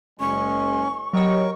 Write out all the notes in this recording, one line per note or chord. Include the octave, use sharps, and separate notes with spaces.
F#1 G#3 C#4 C#6
F#3 G4 A#4 C#5 D#5 G5 C#6